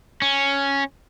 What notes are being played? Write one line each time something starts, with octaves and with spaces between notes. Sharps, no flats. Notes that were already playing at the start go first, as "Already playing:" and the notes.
C#4